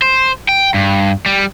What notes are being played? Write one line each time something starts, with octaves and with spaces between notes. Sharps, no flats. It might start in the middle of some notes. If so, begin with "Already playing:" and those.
C5
G5
G2
G3